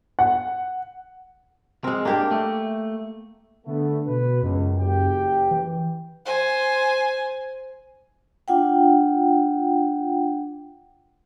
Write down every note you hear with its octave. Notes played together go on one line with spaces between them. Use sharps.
F#5
G#3 C4 A#4
A#3 D4 G4 A#4
A3
D3 A3 B3
B2 B4
C#2 F#2
F#1 G4 G5
E3
C5 G#5
D4 F4 F#5 G5